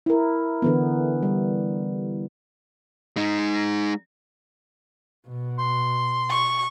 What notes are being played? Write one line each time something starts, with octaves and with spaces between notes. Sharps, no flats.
E4 A#4
D3 E3 B3
G3
G#3 D#4
B2
C6
C#6